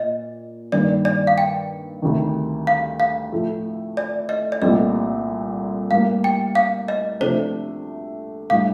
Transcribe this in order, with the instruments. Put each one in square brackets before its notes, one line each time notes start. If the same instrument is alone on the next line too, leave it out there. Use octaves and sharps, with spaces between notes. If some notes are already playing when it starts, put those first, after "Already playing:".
Already playing: [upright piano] A#2 [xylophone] D#5
[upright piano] G2 D#3 A#3 [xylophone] D5
[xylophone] D5
F5
G5
[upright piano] D2 C3 D#3
[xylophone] F5
F5
[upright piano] A2 F3 A3
[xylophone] D5
D#5
D5
[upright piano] C2 A#2 A3 C4 [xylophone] D#5
[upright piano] A2 G3 A#3 [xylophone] F5
[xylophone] G5
F5
D#5
[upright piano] C3 F3 A3 D4 [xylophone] C5
[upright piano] A2 G3 D4 [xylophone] F5